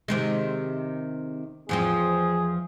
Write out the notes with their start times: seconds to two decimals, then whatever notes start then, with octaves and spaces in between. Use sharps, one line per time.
0.08 C3 D#3 G#3
1.69 E2 F3 C4 G#4